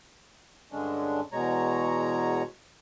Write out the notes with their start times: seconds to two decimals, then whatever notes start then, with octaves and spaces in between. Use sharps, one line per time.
0.72 G2 D3 G#3 C#4 D4
1.32 E2 B2 G#3 C#5 A#5